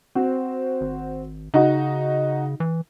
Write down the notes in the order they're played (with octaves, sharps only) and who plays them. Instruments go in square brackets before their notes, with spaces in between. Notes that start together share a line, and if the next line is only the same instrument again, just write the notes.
[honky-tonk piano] C4 F#4 C5
[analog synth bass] G#1
[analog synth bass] C#3 [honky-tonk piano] D#4 F#4
[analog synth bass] E3